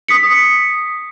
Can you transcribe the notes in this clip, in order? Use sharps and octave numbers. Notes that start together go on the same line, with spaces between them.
D#6 B6 C#7